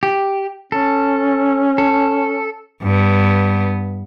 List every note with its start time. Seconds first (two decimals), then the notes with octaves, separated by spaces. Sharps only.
0.03 G4
0.72 C#4 A4
1.78 A4
2.83 G2 B3